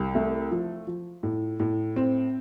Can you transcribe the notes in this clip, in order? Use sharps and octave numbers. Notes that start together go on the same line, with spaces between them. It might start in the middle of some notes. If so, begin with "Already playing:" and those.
Already playing: C2
A3
F3
F3
A2
A2
C4